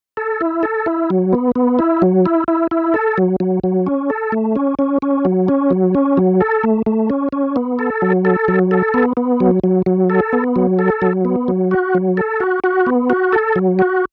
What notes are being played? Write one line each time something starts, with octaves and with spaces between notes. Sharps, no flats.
A4
E4
A4
E4
F#3
B3
B3
E4
F#3
E4
E4
E4
A4
F#3
F#3
F#3
C#4
A4
A3
C#4
C#4
C#4
F#3
C#4
F#3
C#4
F#3
A4
A3
A3
C#4
C#4
B3
A4
F#3
A4
F#3
A4
B3
B3
F#3
F#3
F#3
A4
B3
F#3
A4
F#3
B3
F#3
F#4
F#3
A4
F#4
F#4
B3
F#4
A4
F#3
F#4